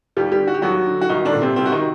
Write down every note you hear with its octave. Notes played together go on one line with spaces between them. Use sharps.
D#2 G3 G4
G3 G4
D3
F#4
G4
D#2 F#3 F#4
D3
F#4
C2 D#3 D#4
D3 D4
A#2
C3 C4
C2 C3 C4
F#4
D#3 D#4